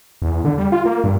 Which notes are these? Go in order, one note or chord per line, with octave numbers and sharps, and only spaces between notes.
E2
D3
G3
F4
A#3
G2